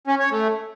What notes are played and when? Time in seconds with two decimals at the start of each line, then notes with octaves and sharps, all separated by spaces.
0.07 C#4
0.19 C#5
0.31 A3